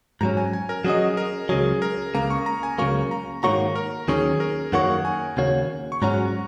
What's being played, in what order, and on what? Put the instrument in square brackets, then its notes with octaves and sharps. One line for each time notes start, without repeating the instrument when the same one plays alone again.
[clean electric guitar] G#2 F#3 C#4 [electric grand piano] A#5
[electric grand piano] G#5
G#5
A#4
[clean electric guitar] F#3 C#4 F#4 D#5 [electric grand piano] G#4
[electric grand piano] A#4
[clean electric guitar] C#2 C#3 F#3 [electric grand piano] G#4
[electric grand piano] A#4
[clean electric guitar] C#2 C#3 A#3 [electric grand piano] A#5
[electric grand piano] C#6
A#5
G#5
[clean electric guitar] C#2 C#3 F#3 A#3 [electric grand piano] C#6
[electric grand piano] A#5
[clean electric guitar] G#2 D#3 A#3 F#4 C#5 [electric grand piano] A#5
[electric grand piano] A#4
[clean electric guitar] D#2 D#3 F#3 C#4 [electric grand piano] G#4
[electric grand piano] A#4
[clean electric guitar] F#2 D#3 A#3 F#4 C#5 [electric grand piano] F#5
[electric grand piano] G#5
[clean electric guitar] D#2 C#3 A#3 F#4 C#5
[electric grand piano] C#6
[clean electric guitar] G#2 F#3 C#4 F#4 [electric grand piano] A#5